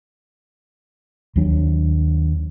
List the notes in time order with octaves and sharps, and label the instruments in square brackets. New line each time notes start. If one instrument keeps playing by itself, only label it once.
[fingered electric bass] D#2 F#3 D4